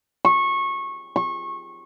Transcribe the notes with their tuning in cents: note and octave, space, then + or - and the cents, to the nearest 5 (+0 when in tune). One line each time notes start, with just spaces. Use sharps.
C#6 -20
C#6 -25